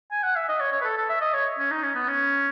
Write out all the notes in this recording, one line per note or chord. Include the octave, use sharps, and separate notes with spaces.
G#5
F#5
E5
D#5
C#5
C#5
B4
A4
A4
E5
D#5
C#5
C#4
D#4
C#4
B3
C#4